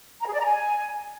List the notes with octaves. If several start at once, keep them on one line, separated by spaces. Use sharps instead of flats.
A#5
G#4
D5
A#5
G#5